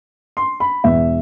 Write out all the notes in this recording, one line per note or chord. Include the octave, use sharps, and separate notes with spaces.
C6
B5
E1 E2 B2 E5